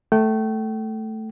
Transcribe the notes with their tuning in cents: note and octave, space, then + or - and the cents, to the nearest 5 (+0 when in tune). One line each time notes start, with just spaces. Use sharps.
A3 +0 G5 -35